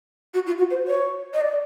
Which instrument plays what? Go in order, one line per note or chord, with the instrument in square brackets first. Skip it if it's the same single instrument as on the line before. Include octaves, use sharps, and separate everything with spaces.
[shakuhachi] F#4
F4
F#4
C5
C#5
D#5
D5